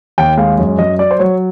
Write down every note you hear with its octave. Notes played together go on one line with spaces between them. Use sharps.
D#2 G5
G#3 F5
F#2
F#2 D#5
F#3 D5
C5
F#3 C#5